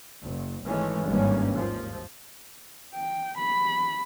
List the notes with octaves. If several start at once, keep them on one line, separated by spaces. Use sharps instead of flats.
F#1
G#1 E3 G#3 A3 C#4
G#1 G2 E3 G3 A#3 C#4
D#2 F3
G5
B5